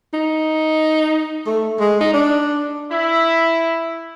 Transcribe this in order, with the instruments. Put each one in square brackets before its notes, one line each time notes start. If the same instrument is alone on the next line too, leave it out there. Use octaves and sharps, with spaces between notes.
[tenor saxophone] D#4
A3
G#3
D#4
D4
[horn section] E4